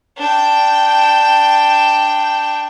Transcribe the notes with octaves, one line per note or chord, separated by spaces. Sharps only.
D4 G5